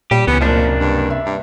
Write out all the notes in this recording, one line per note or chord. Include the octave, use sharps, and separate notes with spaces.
A#2 G3 G4
C#2 E3 B3 C#4
F#1 C3 F3 A#3 D4
G2
E5
G2